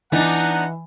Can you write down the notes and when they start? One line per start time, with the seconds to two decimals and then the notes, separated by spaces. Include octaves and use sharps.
0.12 E3 B3 D4 D#4 F#5 A#5